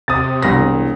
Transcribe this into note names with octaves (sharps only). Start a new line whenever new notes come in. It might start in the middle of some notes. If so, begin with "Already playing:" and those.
C3 D#6 A6
E1 C2 A#6